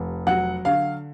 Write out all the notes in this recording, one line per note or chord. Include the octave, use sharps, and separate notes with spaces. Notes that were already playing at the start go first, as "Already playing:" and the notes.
Already playing: F1
F#3 F#5
D3 F5